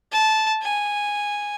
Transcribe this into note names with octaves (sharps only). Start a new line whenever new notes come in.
A5
G#5